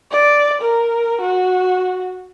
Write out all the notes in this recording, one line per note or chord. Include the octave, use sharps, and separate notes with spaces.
D5
A#4
F#4